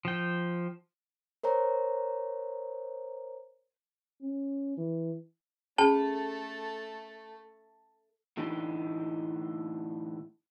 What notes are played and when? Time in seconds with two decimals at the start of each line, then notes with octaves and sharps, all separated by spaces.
0.05 F3 G5
1.43 A#4 C5 C#5 A#5
4.22 C#4
4.77 E3
5.78 A3 C#4 G#4 A4 A5
8.37 A2 D3 E3 A3 D#4 G4